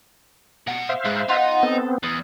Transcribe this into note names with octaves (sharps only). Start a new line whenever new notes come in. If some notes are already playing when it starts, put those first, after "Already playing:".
B2 F#5
C5 E5 F5
G#2 G#4 B4 B5
B3 D#4 F4 F#5
B3 C4 A4
E2 D#6